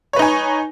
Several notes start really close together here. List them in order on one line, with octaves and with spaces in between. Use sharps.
C#5 B4 D#4 G#5